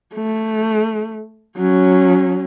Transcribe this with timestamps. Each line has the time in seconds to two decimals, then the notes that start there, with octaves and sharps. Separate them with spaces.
0.14 A3
1.57 F#3 C#4